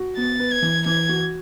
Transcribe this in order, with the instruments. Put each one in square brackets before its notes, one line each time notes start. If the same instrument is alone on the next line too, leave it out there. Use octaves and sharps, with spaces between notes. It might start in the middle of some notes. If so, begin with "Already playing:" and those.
Already playing: [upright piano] F#4
[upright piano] B3 [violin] A6
[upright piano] B4
[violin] G#6
[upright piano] E3
[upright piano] E3 [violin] G#6
[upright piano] F#4